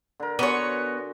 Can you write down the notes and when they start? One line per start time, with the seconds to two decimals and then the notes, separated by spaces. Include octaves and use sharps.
0.20 D3 A#4
0.39 B3 F#4 C#5 G#5 C6